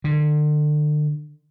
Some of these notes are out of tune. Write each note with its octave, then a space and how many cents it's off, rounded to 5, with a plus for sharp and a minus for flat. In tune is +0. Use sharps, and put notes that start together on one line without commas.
D3 +35